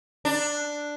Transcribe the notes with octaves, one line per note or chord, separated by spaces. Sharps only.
D4